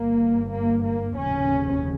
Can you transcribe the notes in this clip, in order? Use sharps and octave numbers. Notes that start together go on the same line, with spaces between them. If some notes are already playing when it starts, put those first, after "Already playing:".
Already playing: G1 G2 A#3
A#3
A#3
F1 D#2 C#3 C#4